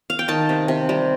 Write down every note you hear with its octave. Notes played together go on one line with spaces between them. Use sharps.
F5
G5
D#3 A5
C3
C3
G3